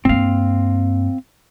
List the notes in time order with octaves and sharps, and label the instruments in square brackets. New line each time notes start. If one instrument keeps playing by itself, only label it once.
[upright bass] G2 A#3 [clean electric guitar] C4 F5